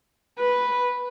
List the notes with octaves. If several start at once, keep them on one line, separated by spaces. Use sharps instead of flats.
B4